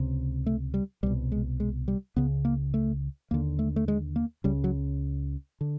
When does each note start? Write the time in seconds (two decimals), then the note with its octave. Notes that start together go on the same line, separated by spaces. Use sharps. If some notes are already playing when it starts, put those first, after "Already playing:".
Already playing: C#2 C3
0.46 A3
0.74 G3
1.03 C2 B2 G3
1.32 G#3
1.60 G#3
1.88 G3
2.16 C#2 C#3 B3
2.45 A#3
2.74 A3
3.31 D#2 D3 A#3
3.59 A3
3.76 A3
3.88 G#3
4.16 A#3
4.44 C#2 C#3 G3
4.64 F#3
5.61 D3